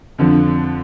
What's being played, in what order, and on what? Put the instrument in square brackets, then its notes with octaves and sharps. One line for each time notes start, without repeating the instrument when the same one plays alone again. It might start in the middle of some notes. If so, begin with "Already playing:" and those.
[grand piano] F2 D3 F3